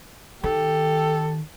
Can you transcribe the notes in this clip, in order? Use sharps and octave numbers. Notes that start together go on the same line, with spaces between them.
D#3 G4 A4